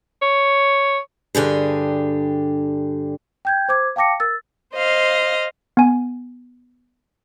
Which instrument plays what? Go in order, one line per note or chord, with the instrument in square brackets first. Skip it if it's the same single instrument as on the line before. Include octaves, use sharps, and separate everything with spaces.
[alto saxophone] C#5
[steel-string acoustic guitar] G2 D3 G4 G#4
[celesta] G5 G6 G#6
C5 D6 G#6
F5 G5 A5 D6 A#6 C#7
A#4 E6 A6
[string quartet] C5 D#5 F5
[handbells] B3 G#5